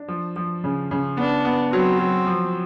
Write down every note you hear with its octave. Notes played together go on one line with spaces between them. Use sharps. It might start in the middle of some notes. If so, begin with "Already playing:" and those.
Already playing: D4
F3
F3
C#3
C#3
B3 D4
B3
F#3 C4
F#3
F3